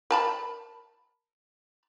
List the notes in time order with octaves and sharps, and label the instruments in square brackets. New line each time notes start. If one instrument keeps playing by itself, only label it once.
[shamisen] A#4 A5 B5